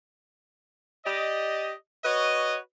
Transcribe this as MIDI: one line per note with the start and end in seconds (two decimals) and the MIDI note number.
1.06 1.72 67
1.06 1.72 74
1.06 1.72 75
2.04 2.57 66
2.04 2.57 71
2.04 2.57 73
2.04 2.57 75